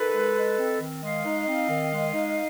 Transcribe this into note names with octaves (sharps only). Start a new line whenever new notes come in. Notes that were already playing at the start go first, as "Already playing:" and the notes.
Already playing: D#3 A4 B4
G#3
D#4
C4
D#3
G#3 D#5 F5
D#4
C4
D#3
G#3
D#4